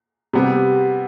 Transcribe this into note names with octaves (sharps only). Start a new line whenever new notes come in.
C3 G3 B3